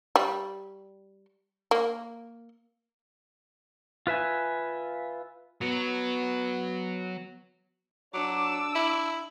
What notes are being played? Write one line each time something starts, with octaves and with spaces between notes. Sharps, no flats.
G3
A#3
F4 B4 E5 G#5
F#3 B3
F#3 D4 D6 E6
E4